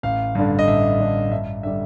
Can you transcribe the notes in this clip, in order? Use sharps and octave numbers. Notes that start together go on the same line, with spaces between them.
A1 F5
G2 D3
D#5
A1 E5
G2 D3
G2 E5
D3 G3 E5